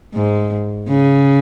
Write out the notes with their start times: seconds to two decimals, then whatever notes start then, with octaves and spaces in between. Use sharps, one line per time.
0.14 G#2
0.88 C#3